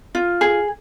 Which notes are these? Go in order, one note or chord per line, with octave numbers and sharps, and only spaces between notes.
F4
G#4